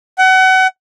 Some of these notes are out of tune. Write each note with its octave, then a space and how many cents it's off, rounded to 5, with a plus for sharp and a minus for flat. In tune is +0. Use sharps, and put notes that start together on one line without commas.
F#5 +30